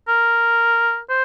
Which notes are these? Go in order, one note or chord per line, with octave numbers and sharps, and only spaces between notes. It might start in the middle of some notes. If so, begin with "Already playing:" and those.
A#4
C5